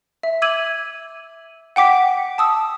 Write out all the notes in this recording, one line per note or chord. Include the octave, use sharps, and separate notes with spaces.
E5
D6 E6 G#6 D#7 F#7
F#5 G5 D6 B6
A5 D#6 E6